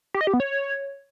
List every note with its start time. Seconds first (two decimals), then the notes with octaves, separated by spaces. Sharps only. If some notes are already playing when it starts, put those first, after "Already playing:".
0.14 G4
0.21 D#5
0.27 G4
0.33 B3
0.40 C#5